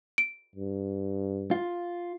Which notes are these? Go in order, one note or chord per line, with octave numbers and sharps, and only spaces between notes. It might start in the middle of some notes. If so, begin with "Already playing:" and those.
D7
G2
F4